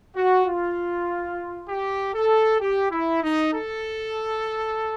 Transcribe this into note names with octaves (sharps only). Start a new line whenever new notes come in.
F#4
F4
G4
A4
G4
E4
D#4
A4